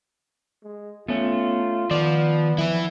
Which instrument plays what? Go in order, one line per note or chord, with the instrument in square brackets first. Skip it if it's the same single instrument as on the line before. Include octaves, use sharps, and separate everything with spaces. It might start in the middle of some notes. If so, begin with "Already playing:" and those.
[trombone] G#3
[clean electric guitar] A3 C#4 [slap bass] B3 [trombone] F4
[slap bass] D#3 [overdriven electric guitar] F3 [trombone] B3 [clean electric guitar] D5
[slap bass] F3 [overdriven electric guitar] E4 B4